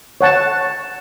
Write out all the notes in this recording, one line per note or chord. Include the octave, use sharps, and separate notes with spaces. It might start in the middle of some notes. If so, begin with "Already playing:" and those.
C#5 F#5 A5